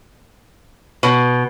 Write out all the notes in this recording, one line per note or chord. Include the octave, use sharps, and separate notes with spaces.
B2